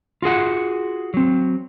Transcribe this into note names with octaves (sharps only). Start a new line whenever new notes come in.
F4 F#4 G#4 F#5
F#3 C4